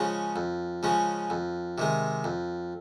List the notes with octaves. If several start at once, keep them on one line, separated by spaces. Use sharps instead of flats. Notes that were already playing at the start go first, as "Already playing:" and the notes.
Already playing: C#3 F3 G#3 C#4
F2
C#3 F3 G#3 C#4
F2
C3 D#3 G#3
F2